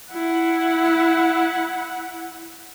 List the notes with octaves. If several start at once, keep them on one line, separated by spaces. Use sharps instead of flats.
E4 F#5